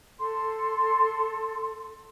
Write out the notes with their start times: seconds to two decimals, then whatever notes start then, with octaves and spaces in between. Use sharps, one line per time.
0.19 A4 C6